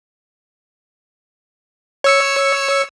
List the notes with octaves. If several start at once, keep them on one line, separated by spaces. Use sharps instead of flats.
C#5 E6 C#7